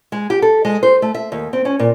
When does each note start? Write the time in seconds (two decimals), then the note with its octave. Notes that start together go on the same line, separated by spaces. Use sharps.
0.12 G#3
0.30 G4
0.42 A4
0.65 G#3
0.83 C5
1.02 A3
1.15 E5
1.32 D#2
1.53 C4
1.65 C#4
1.79 A#2